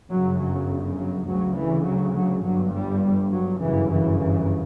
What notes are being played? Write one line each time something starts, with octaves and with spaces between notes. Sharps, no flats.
G1 F#2 C#3 F#3
F#3
F#3
D2 C#3 F#3
E3
F#3
F#3
G1 G2 F#3
G3
F#3
G1 F#2 C#3 E3
E3
E3